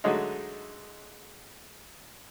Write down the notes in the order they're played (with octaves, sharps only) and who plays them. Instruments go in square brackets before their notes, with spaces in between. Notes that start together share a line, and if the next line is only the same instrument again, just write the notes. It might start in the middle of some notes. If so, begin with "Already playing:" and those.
[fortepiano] D3 F#3 G#3 A3 D#4